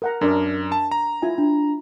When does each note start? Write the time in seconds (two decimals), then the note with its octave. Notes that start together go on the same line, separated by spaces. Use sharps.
0.02 A#4 F#5 A#5
0.21 F#2 D4 A#4 D5
0.72 A5
0.91 A#5
1.22 E4 F4 G#5
1.38 D4